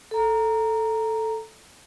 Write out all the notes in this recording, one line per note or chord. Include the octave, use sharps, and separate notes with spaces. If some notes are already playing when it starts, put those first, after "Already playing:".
A4 A#5